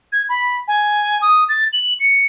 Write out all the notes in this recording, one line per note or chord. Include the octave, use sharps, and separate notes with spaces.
G#6
B5
G#5
D#6
A6
F#7
C#7